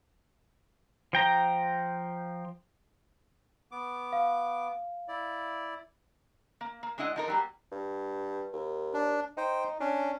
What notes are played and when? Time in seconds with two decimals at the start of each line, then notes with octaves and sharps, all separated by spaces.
1.13 F3 G5 A#5
3.71 B3 D6
4.13 F5
5.08 E4 D5
6.61 A#3
6.83 A#3
6.98 G#3 D4 E4 D#5 F#5
7.16 F3 D#4 A#4
7.28 F#3 G3 A#3
7.72 G2
8.53 D#2
8.94 D4
9.37 D#4 C5 G5
9.80 C#4 D4